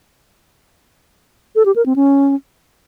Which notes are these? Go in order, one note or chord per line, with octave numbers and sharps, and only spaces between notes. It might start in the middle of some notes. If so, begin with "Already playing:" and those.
A4
G4
A#4
C4
C#4